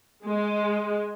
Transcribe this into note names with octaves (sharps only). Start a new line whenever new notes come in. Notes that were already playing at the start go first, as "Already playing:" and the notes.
G#3